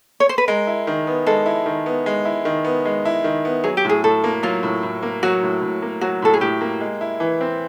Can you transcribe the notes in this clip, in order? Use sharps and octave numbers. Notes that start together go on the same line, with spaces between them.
C#5
C5
B4
G#3 A#4
E4
D#3
B3
G#3 A4
E4
D#3
B3
G#3
E4
D#3
B3
G#3
E4
D#3
B3
F#3 G#4
G4
A2 G#4
A2 A4
A#3
F#3 F4
A2
A2
A#3
F#3 F#4
A2
A2
A#3
F#3 F#4
A2 A4
G#4
A2 G4
A#3
G#3
E4
E3
C4